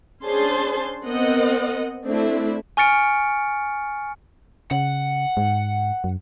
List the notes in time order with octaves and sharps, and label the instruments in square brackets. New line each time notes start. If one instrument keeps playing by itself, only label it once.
[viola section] C#4 D4 G#4 C5 A5 C6
B3 C4 A#4 D#5 F#5
A3 C4 D4 E4
[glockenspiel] G#5 C#6 F6 A6 C#7 D7
[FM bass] C#3 [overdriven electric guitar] F#5
[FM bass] G#2
F#2